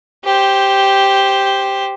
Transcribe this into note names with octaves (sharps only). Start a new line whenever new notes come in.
G4 C5